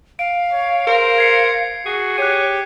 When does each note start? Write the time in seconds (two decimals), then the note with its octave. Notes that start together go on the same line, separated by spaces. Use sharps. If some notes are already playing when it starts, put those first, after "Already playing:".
0.19 F5 D7
0.52 C#5
0.87 A#4 C5
1.18 G#6 C7 C#7
1.86 F#4 G#4
2.18 G4 C#5 F#6 D#7